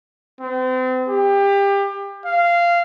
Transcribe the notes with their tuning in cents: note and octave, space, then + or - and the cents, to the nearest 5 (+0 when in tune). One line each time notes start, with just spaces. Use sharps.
C4 -35
G4 +25
F5 -15